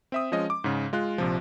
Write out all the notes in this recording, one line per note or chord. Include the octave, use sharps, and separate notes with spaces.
C4 E5 D#6
F3 G#3 C#4 D#5
D6
G#2 C#3
G#3 F4 F#6
A#1 C3 F3